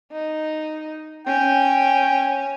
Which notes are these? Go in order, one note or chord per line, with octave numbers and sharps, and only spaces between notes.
D#4
C#4 G5